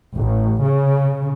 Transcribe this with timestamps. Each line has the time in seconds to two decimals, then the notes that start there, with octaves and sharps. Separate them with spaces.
0.15 A1
0.61 C#3